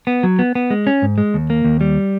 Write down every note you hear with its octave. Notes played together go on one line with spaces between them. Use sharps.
B3
F#3
B3
B3
G#3
C#4
G#2
G#3
D#2
A#3
D#2
G3